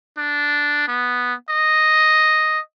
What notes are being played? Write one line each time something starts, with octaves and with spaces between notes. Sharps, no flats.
D4
B3
D#5